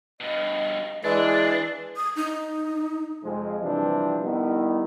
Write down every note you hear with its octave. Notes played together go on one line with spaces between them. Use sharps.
G2 B2 D#5
E3 G#3 D4 D5
D#6
D#4
F2 C3 F3 G#3
C3 E3 F3 G3 C4 D4
D#3 G3 B3 E4